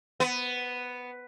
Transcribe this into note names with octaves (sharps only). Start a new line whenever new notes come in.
B3